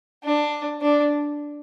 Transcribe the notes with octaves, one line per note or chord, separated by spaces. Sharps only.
D4
D4